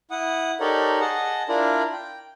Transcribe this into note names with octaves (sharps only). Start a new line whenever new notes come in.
E4 F#5 D#6
D#4 G4 A4 A#4 C#5 D5
G#4 D#5 F#5 A5
D4 E4 F4 A#4 D5
G5